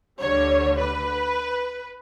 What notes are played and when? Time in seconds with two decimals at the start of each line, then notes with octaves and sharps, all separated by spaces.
0.21 D2 D3 G3 C#5
0.79 B4